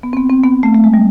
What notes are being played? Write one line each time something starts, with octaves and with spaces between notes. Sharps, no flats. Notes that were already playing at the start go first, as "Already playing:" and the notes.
B3
C4
B3
C4
B3
A3
A3
G#3
G3